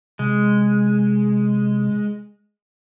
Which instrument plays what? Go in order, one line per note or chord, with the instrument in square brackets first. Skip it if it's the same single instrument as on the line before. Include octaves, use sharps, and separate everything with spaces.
[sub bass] C3 [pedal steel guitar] G#3